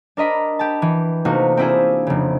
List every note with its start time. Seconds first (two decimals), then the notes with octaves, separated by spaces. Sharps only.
0.17 D4 A#4 D#5 B5
0.59 G4 A5
0.82 E3
1.25 C3 A3 A#3 D#4 F4 F#4
1.57 C4 D4 E4 F4 G#4
2.07 F1 C#3